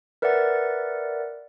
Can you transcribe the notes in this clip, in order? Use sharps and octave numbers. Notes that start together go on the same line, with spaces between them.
A#4 B4 D5 E5 F#5 A6